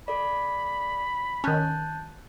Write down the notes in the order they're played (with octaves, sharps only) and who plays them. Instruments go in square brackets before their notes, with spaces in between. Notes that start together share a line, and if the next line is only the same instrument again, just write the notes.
[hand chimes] A4 D5 [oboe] B5
[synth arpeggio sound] D#3 C#4 [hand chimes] A5 F#6 G6